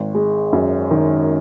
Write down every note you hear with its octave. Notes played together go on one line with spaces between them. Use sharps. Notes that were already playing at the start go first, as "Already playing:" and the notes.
Already playing: G#1
G#3
F#2
D#3